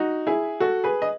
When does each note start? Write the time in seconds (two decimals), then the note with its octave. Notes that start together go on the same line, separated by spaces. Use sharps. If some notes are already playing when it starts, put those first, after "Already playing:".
Already playing: D#4 F#4
0.27 E4 G#4
0.60 F#4 A4
0.84 G#4 B4
1.02 D#5